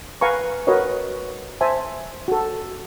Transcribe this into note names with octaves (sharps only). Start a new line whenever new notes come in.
B4 F5 F#5 G#5 A#5 C#6
F#4 A#4 B4 C#5 D#5
C5 E5 G#5 A5
F#4 A4